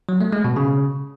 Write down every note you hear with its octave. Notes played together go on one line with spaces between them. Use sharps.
F#3
A3
G#3
B2
C#3